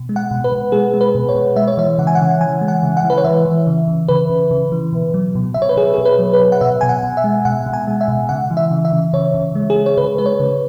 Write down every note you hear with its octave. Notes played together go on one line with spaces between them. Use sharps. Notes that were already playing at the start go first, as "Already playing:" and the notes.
Already playing: B2
G#3
F#5
B2
B4
B2
G#3 G#4
G#3
B4
B2
C#5
B2
G#3 E5
C#5
E3 E5
C#3 F#5
G#5
F#5
C#3
E3 G#5
G#3
F#5
C#3
F#5
E3
B4
C#5
E3 E5
E3
C#3
C#3
C#3 B4
C#3
C#3
E3
B2
F#3
B2
B2 E5
C#5
B4
B2 G#4
B2 G#4
B4
F#3
B4
B2
F#5
B2 E5
B2 G#5
F#5
B2
E5
G#3
B2 F#5
B2
G#5
G#3
E5
B2
C#3 F#5
E3
E5
C#3
E5
C#3
C#3 C#5
C#3
G#3
G#4
G#3
C#5
C#3 B4
G#3 B4
C#5
C#3